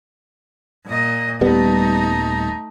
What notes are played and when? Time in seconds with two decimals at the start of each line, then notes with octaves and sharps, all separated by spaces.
0.86 A#2 D#5
1.41 D#1 G3 A3 B3 D#4